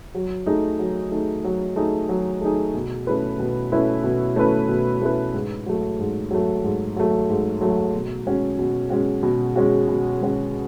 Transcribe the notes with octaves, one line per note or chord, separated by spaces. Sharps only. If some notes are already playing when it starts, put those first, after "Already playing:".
F#3
A3 D#4 G#4
F#3
A3 D#4 G#4
F#3
A3 D#4 G#4
F#3
A3 D#4 G#4
B2
A3 C#4 E4 B4
B2
A3 C#4 E4 B4
B2
A3 C#4 E4 B4
B2
A3 C#4 E4 B4
G#2
F#3 A3
G#2
F#3 A3
G#2
F#3 A3
G#2
F#3 A3
B2
G#3 C#4 F#4
B2
G#3 C#4 F#4
B2
G#3 C#4 F#4
B2
G#3 C#4 F#4